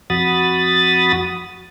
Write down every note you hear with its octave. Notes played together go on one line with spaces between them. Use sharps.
F2 F#4 B5 D#6 A6